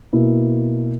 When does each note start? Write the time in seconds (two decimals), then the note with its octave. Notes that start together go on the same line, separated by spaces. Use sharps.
0.13 B2 A#3 E4